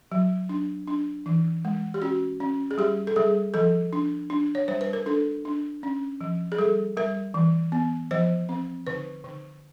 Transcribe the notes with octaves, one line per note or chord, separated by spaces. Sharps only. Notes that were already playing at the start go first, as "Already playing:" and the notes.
F#3
D4
D4
E3
G#3
G4
C#4 F#4
C#4
G#4
G3 G4
A4
G3 G#4
F3 A4
D4
D4
C#5
G3 C5
B4
A#4
D4 A4
D4
C#4
F3
G#4
G3 A4
G3 A#4
E3
B3
F3 C5
C4
D3 B4
D3